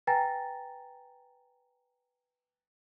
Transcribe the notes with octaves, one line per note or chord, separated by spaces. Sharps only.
B4 G5 G#5 A#5 A6 A#6